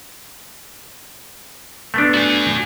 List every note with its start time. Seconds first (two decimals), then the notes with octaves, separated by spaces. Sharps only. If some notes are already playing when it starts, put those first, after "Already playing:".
1.94 A3 B3 D4
2.14 F#4 G#5